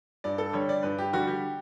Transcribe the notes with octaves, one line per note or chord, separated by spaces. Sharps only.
G2 D5
A4
D3 G3 C#5
D5
G2 B4
G4
D3 G3 F#4
G4